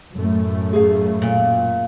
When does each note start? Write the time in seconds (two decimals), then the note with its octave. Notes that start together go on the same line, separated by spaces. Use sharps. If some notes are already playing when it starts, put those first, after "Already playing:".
0.15 F#2 A2 A3
0.73 G#4 F5
1.22 A#2